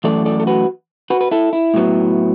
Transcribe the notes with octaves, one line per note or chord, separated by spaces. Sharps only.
F#2 E3 A3 A4 D5
A4 D5
A4
F#4 B4
F#4 B4
B4
E4 A4
E4
A2 F#3 B3